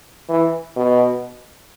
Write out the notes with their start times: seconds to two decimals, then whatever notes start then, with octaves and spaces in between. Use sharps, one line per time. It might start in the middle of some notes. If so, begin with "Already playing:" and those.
0.29 E3
0.76 B2